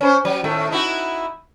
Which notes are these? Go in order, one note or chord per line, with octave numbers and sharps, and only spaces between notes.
C#4 B4 C5
F#3
A2 D#3 A3
D#4 E4 F#4